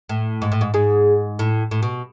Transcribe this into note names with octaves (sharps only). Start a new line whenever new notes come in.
A2
G#2
A2
G#2
G#2 G#4
A2
A2
B2